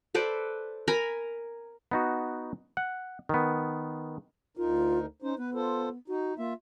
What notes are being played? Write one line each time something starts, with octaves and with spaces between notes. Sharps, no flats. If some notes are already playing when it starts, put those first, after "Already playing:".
A4 B4 C5 D5
A#4 G#5 A#5 B5
B3 D#4 F#4
F#5
D#3 B3
D2 D#4 F4 A#4
C#4 D#4 C5
B3 B4
F4 A4 C5
D#4 F#4
A#3 F4 E5